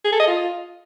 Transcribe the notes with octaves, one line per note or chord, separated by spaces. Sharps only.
G#4
A4
D#5
F4